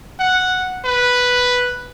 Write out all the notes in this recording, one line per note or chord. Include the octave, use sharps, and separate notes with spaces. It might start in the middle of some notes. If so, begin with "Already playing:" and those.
F#5
B4